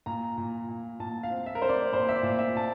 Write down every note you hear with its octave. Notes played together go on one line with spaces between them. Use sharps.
A#2 A#5
A#2
A#2
A#2 A5
F5
C4
E5
A#4
C4 C5
D5
A#2 C5
E5
D5
A#2
E5
A#2 A5